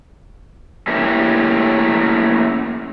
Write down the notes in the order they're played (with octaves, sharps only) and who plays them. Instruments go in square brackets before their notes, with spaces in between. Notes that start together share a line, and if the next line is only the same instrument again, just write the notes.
[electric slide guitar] A3 A#3 C#4 E4 G4